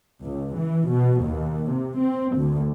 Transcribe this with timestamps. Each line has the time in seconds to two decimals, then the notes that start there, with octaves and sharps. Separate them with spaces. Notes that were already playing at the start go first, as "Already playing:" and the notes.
0.25 C#2
0.57 E3
0.90 B2
1.24 D#2
1.71 C3
2.00 C4
2.37 D2